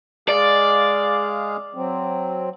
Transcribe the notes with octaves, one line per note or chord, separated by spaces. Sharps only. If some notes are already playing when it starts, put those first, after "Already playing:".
G#3 G#4 D5 F5
F#3 C4